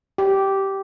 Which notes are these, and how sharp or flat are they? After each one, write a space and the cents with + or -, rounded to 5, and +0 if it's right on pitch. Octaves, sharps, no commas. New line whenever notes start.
G4 -10